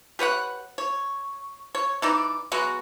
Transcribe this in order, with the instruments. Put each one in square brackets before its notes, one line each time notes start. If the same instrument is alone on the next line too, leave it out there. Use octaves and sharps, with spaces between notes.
[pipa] G4 B4 C#5 F#5
C#5
C#5
E3 D#4 D5
F#3 G#3 B3 F#4